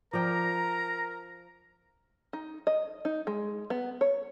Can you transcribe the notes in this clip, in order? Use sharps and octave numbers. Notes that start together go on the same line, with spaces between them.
F3 A#4 D5 G5 A#5
D#4
D#5
D#4
G#3
B3
C#5